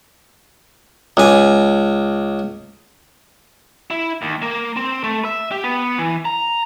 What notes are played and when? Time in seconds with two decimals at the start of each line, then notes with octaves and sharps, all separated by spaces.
1.17 C#2 G#5
3.90 E4
4.22 D#2
4.42 A#3
4.76 C4
5.04 A3
5.25 E5
5.51 G4
5.64 B3
5.98 E3
6.25 A#5